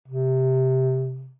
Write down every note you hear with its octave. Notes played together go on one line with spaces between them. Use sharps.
C3